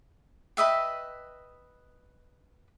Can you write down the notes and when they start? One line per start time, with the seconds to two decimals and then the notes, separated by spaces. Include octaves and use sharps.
0.57 B4 D#5 E5 G5